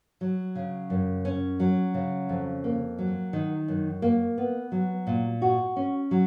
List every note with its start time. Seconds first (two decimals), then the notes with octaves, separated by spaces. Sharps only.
0.21 F#3
0.55 C#3
0.90 F#2
1.25 C#4
1.60 F#3
1.94 C#3
2.29 F2
2.64 A#3
2.99 F#3
3.33 D#3
3.68 F#2
4.02 A#3
4.38 B3
4.72 F#3
5.07 A#2
5.42 F#4
5.76 C#4
6.11 F#3